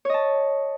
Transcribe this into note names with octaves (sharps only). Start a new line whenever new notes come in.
C#5 D#5 A5